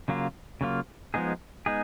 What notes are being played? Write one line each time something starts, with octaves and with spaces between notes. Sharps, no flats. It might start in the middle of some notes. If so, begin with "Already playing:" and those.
C#3 F#3 A#3 F4
C#3 F#3 A#3 F4
F3 G#3 B3 D#4 G#4
G#3 B3 D#4 G#4